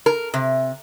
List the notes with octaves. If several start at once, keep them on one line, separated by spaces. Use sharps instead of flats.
A#4
C3